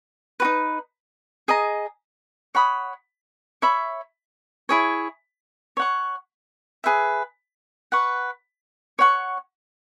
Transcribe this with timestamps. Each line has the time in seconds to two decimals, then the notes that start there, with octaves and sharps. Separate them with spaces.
0.40 F#4 B4
0.45 D#4
1.48 G#4 D#5 A#5
2.55 C#5 F#5 B5 D#6
3.62 C#5 E5 B5
4.69 E4 G#4 C#5
5.77 C#5 F#5 C#6
6.84 G#4 B4 E5
7.92 B4 F#5 C#6
8.99 C#5 F#5 C#6